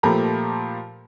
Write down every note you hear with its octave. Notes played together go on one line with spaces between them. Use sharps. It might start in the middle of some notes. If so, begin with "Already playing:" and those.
A#2 F3 A3 G4 A#5 B5